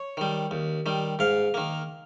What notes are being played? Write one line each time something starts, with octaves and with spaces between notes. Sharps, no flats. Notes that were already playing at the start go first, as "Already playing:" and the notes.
Already playing: C#5
D#3 G3
D#2
D#3 G3
G#2 F5
D#3 A#3